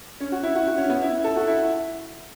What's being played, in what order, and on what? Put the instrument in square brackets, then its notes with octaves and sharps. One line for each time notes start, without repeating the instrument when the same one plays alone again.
[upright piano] C#4
F#4
E4
F#4
F#4
C#4
B3
E4
A4
F#4
E4